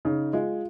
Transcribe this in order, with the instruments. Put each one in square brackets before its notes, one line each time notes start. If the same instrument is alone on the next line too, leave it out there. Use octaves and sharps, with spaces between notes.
[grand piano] C#3 [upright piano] D#4
[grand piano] G#3 [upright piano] F4